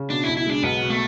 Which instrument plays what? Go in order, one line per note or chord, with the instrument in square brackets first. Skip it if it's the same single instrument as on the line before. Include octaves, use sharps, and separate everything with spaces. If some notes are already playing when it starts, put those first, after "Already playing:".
Already playing: [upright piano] C#3
[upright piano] B2 [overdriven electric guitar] D4
[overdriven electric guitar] E4
[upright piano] B1
[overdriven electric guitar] E4
[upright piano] G#3 [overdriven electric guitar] D4
[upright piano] B1 [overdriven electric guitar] B3
[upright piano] B2
[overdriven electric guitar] A3